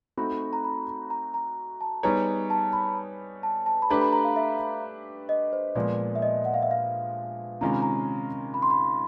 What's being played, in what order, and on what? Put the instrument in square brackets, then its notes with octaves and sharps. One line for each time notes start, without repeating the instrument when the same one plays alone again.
[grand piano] A3 C4 D#4 F#4 [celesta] B5
[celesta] A#5
B5
A#5
A#5
A5
[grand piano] G3 B3 D#4 G#4 C#5 [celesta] A#5
[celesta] A5
B5
A5
A5
B5
[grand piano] A3 D4 G4 B4 [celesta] A#5
[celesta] B5
A#5
F5
E5
D#5
C5
[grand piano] A#2 F3 G#3 B3 [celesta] D5
[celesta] E5
D#5
F#5
F5
E5
F5
[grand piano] C3 D#3 G#3 C#4 F4 [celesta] A#5
[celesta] B5
A#5
B5
C6
B5